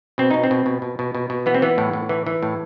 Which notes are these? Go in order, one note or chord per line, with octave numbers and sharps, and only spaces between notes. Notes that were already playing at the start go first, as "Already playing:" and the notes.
B2 C4
B2 D#4
C4
B2
B2
B2
B2
B2
B2
E3 B3
C4
E3 B3
A2
A2
E3
E3
A2